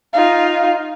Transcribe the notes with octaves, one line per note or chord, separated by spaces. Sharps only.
D#4 F4